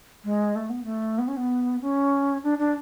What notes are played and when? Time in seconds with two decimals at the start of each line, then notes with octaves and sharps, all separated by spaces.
0.24 G#3
0.55 A3
0.69 B3
0.84 A3
1.18 B3
1.28 C#4
1.37 B3
1.81 C#4
2.43 D4
2.58 D4